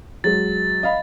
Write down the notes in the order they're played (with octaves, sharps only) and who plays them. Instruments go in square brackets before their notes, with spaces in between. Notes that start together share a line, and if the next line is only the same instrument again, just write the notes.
[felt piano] F#3 G#3 [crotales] A6
[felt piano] D#5 F5 B5